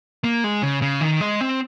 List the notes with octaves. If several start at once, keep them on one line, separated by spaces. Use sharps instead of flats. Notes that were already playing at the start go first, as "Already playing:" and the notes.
A#3
G#3
C#3
C#3
D#3
G#3
C4